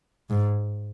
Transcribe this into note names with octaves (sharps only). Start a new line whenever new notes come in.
G#2